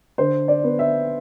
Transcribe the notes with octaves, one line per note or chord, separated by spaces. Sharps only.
D3 C5
D5
B3
E5